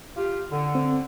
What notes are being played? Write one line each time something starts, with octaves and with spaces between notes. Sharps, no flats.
F4 G4
D3
C4